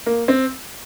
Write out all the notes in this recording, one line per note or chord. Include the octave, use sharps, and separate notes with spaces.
A#3
C4